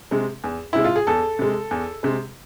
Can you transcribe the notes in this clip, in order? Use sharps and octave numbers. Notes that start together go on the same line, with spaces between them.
C3 G#3
E2
C3 G#3 E4
F4
G#4
E2 A4
C3 G#3
E2
C3 G#3